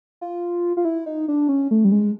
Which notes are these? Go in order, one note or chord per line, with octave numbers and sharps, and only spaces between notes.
F4
F4
E4
D#4
D4
C#4
A3
G3
G#3